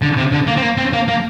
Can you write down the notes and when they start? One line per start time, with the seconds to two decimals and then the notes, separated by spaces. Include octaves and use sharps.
0.02 D3
0.17 C3
0.32 D3
0.47 A#3
0.57 C4
0.62 A#3
0.77 C4
0.93 A#3
1.08 A#3